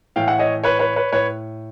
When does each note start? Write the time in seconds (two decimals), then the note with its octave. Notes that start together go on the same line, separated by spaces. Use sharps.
0.16 A2 E3 F5 G5
0.28 E5 F#5
0.39 C#5 D#5
0.64 B4 C#5
0.79 B4 C#5
0.96 B4 C#5
1.12 A2 B4 C#5